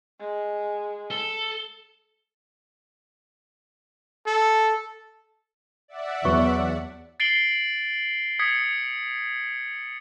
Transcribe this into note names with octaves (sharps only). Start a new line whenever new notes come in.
G#3
A4 G7
A4
D5 E5 F#5
E2 F#3 B3 C#5 C#6
A6 C7 D7 F#7 G7
D#6 G#6 B6 C#7